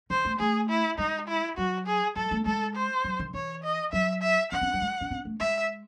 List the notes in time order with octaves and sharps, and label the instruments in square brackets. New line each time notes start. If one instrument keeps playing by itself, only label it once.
[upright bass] D#3 [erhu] C5
[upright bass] A3
[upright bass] A3 [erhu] G#4
[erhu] E4
[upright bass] G#3 [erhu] D#4
[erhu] E4
[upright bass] F#3 [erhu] F#4
[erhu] G#4
[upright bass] F#3 [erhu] A4
[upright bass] A3
[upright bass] G#3 [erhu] A4
[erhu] C5
[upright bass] F#3
D#3
[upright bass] E3 [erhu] C#5
[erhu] D#5
[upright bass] F#3 [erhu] E5
[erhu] E5
[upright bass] C#4 [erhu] F#5
[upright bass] C4
F#3
G#3
C#4
C4
A3
[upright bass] G#3 [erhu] E5